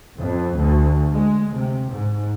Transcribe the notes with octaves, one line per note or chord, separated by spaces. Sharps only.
F2
D2
G#3
C3
G#2